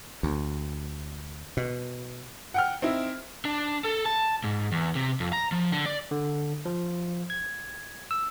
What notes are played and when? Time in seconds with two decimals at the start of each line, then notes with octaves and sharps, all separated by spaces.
0.23 D2
1.57 B2
2.54 F#5 G5 F6
2.82 C4 D#4 E4
3.45 D4
3.84 A4
4.05 A5
4.44 G#2
4.72 E2
4.95 C3
5.20 F2
5.33 A#5
5.52 F3
5.72 D3
5.86 D5
6.11 D3
6.65 F3
7.30 G#6
8.11 E6